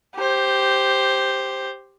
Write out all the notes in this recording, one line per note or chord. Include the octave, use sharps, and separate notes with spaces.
G4 C5